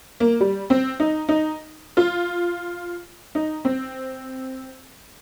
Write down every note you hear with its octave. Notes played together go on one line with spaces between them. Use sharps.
A#3
G3
C4
D#4
D#4
F4
D#4
C4